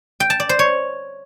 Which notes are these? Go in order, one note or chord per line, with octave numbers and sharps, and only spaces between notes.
G5
A5
D5
C5
C#5